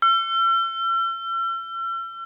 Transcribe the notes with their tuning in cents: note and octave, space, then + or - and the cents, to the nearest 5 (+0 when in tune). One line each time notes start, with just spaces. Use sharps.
E6 +45